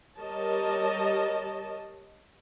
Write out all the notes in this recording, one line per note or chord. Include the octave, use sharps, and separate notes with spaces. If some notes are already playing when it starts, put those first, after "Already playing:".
G3 A#4 C#5 D#5 A5